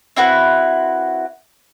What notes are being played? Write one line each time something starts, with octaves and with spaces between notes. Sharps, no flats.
C4 E4 F#4 B4